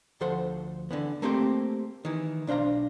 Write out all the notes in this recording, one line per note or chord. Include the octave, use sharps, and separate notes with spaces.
D2 F3 A4 C5 F#5
D3 E3 B3
A3 A#3 C4 G4 C5 G5
D#3 E3
B1 D4 C5 F5 A#5